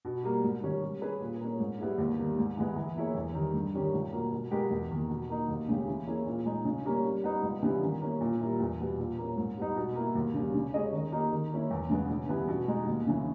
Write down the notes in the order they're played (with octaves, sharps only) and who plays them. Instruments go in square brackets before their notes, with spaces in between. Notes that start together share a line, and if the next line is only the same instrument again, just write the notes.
[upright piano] B2
G3 A#3
G#2
D#3 G3 C#4
G3
C#4 G#4 B4
A#2
A#3 C#4
G#2
G3 B3 E4 G#4
D#2
D#3 G3
G#2
E3 G#3 B3
E3
A#3 E4 G#4 C#5
E2
D#3 G3
G2
D#3 G3 C#4 G4
C#2
B2 A#3
B2
G#3 B3 G4 A#4
E2
D#3 A#3
B2
A#3 D#4
D#2
C#3 G#3 C#4 G4
E3
A#3 C#4 E4 G#4
A#2
G#3 D#4
C#3
G3 A#3 C#4
G3
B3 D#4
C#2
C#3 E3 G3 B3
D#3
A#3 C#4 E4
A#2
G3 A#3 E4
E2
B2 G3 B3
A#2
A#3 C#4
G#2
G3 B3 D#4
B2
A#3 E4
D#2
C#3 G3
C#3
G#3 C#4 G#4 D#5
D#3
A#3 D#4 G4
D#3
A#3 C#4 E4
E2
C#3 G#3 B3
C#3
E3 G3 B3
B2
G#3 D#4
D#2
C#3 E3